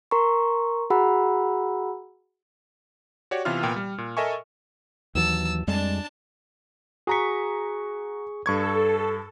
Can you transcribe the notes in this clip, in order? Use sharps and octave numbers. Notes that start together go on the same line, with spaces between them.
A#4 A#5 C6 C#6
F#4 G#4 F#5 A#5 B5 E6
F#4 G4 C#5 D5
C3 E3 B3 F4 F6
A#2 B3 G5
G3
A#2
A4 A#4 D#5 E5 G#5 C#6
D#2 E3 F#3 A5 E6
F2 G3 G#3 D4 A5
F#4 G#4 A#5 C#6 B6
G2 A4 C#6 G#6